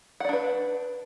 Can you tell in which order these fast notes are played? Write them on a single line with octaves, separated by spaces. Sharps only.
F#5 D5 D4 B4